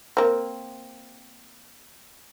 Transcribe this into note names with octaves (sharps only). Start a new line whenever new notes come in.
A#3 C4